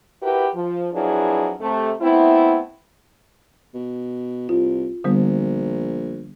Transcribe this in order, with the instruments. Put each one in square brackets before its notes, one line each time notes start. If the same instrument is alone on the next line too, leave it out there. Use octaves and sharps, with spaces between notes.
[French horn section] E4 F#4 G4 A#4 B4
F3
F2 F#3 D4 E4 G#4 B4
C3 A3
A3 B3 C4 E4
[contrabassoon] B2
[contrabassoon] C2 [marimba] F4
[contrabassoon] A#1 [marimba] D3 G3 B3